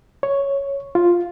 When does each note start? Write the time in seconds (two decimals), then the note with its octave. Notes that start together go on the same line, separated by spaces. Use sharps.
0.23 C#5
0.95 F4